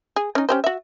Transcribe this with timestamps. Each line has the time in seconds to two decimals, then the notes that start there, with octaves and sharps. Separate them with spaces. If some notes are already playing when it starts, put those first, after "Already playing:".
0.16 G#4
0.35 C#4 D#4
0.49 C#4 G4 C5
0.64 F#4 E5